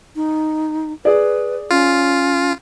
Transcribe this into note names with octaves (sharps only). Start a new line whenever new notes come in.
D#4
G#4 B4 D5
C#4 F4